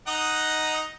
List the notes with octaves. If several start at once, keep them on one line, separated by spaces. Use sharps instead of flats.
D#4 D#5 F#5